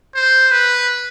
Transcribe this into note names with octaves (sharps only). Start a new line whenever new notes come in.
C5
B4